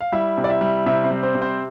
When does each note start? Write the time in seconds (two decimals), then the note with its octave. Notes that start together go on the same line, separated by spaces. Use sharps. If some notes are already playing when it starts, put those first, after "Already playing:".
0.01 F5
0.12 G3 E4 E5
0.37 C3
0.44 D5
0.49 E4 E5
0.61 G3
0.86 C3 E4 E5
1.04 C4 C5
1.11 G3
1.23 C4 C5
1.35 C3
1.42 C4 C5